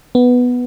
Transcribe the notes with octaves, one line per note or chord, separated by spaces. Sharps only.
B3